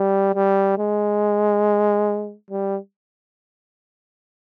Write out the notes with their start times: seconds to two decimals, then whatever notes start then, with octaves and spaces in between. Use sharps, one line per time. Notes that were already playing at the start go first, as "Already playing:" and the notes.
Already playing: G3
0.35 G3
0.78 G#3
2.51 G3